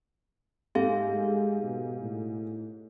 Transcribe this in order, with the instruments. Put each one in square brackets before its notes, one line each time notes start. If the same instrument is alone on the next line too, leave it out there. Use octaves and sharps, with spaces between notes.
[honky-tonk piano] G#2 [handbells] G4 A4 F5
[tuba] G#3
B2
A2